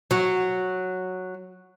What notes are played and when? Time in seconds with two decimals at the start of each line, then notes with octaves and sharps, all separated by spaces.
0.11 F#3 F#4